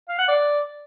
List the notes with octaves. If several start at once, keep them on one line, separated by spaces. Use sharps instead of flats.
F5
F#5
D5